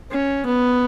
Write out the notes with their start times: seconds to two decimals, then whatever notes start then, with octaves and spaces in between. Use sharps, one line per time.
0.12 C#4
0.46 B3